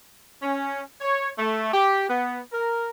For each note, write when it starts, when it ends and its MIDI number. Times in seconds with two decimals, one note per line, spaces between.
0.42 0.81 61
1.01 1.30 73
1.38 1.72 57
1.74 2.08 67
2.09 2.39 59
2.52 2.87 70